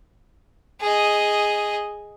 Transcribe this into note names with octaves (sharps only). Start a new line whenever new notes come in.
G#4 D#5